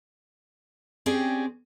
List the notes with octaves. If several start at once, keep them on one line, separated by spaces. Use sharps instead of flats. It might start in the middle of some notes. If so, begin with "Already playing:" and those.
C4 C#4 G4 G#4 D5